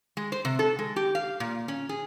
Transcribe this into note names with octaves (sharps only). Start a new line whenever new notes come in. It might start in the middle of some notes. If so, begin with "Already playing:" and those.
G#3
C5
C3
A4
G#3
G4
F5
A#2
C#4
G#4